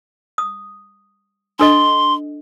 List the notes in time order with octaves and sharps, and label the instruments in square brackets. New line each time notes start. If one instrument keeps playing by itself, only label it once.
[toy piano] D#6
[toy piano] D4 A4 D#5 [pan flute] C6